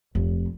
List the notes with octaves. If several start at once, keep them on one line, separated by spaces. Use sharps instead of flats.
F1